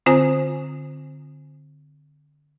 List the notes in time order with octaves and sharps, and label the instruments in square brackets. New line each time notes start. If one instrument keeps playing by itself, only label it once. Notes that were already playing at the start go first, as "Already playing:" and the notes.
[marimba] D3 C4 F4 C5 G#5